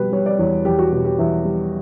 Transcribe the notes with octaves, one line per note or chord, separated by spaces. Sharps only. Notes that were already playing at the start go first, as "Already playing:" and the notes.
Already playing: B2 G3 B4
G3 C#5
D5
E2 C#5
E2 G4
F#4
B2 G4
G4
E2 E5
G3